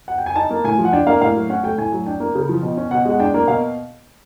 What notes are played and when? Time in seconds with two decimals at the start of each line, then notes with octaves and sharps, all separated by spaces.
0.08 F#5
0.18 G5
0.26 G#5
0.36 D#4 A5
0.50 A#3
0.64 A2 G#5
0.79 F3
0.85 F#5
0.92 D4 G5
1.07 A#3 F5
1.21 A2 F5
1.35 F#3
1.50 C#4 F#5
1.63 A3 G5
1.78 A2 G#5
1.92 F#3
2.06 D4 G5
2.20 A#3
2.35 C#3
2.49 F3
2.62 B2
2.77 C#4
2.91 B2 F#5
3.05 G#3 F#5
3.20 D4 G5
3.34 A#3
3.47 B2 F5